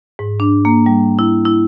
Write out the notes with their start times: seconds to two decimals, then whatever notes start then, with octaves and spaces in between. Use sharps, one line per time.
0.19 G#2
0.40 D4
0.65 A#3
0.86 G3
1.19 E4
1.45 E4